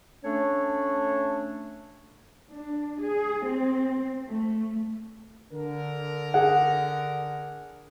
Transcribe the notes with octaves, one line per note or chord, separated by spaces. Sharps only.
A3 C#4 D4 A4 C#5
D4
G#4
C4
A3
D3 A#4
G#4 F#5